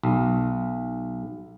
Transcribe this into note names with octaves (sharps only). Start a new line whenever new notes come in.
B1